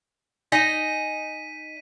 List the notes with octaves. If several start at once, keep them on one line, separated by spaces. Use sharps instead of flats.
D#4 D#5 G#5 B6 D#7